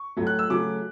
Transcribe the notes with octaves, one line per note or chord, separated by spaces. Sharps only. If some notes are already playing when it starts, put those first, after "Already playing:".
Already playing: C#6
A2 F#3 A3
F#6
E6
C#3 F#3 A3 D6